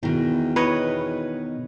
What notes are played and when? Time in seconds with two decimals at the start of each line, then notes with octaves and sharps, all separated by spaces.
0.03 E2 B2 D#3
0.56 E2 B4 C#5 D#5